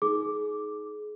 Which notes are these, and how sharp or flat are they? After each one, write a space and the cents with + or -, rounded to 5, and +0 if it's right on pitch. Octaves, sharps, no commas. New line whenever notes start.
D#4 +15 G#4 +30 D6 +0